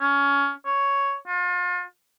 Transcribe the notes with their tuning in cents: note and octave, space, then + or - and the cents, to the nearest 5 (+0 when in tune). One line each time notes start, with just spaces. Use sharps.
C#4 +20
C#5 +5
F4 +35